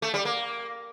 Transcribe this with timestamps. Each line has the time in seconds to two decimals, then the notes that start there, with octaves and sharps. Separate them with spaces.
0.02 A3
0.14 G3
0.25 A#3